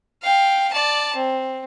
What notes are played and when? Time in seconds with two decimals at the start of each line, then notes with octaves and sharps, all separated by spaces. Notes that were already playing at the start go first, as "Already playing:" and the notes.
0.23 F5 G5
0.73 D5 A5
1.16 C4